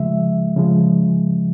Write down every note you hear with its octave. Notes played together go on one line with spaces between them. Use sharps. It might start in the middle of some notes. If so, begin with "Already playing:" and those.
Already playing: C#3 F3 G#3 E5
C#3 F3 G#3